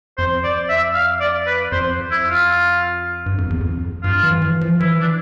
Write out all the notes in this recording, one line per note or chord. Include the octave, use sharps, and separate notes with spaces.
F2 C5
D5
E5
F5
D5
B4
F2 C5
E4
F4
G2
F2
E2
F2
G2 F4
E3
E3
F3
E3 E4
D4